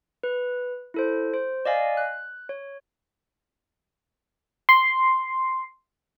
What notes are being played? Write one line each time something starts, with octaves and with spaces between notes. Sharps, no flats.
B4
E4 A4 C5
C5
D5 D#5 F5 G#5
F#6
C#5
C6